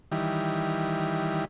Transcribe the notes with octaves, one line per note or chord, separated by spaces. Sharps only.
D#3 E3 G3